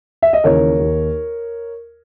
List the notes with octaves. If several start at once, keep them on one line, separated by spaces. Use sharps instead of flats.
E5
D#5
D#2 C#3 E3 A#4 C#5
D#2 D#3